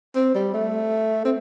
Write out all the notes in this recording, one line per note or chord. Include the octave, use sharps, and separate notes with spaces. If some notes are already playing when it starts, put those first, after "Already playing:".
C4
G3
A3
C4